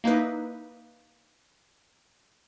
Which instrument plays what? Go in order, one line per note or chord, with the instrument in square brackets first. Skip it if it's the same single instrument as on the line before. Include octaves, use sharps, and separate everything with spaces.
[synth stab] A#3 D#4 E4 B4